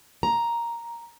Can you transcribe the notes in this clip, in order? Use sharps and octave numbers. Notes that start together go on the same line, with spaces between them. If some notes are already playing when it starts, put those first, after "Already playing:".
A#5